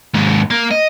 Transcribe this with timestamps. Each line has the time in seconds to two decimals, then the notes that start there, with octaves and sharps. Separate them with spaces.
0.14 D#2 G#2
0.50 A#3
0.71 D#5